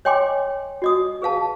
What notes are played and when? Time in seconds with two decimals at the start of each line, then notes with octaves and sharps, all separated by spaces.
0.05 C#5 D#5 G5 G#5 C6 D6
0.82 F#4 D#5 D#6
1.22 G#4 B4 F5 A5